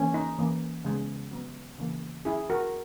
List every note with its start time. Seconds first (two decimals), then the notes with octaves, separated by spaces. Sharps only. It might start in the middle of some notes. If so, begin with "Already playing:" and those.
Already playing: E3 A#3 C#4
0.14 D#4
0.39 E3 A#3 C#4
0.85 C#3 G#3 B3
1.31 F#3 B3
1.78 C#3 E3 A#3
2.25 F#3 C#4 E4 G#4
2.50 F#4 A#4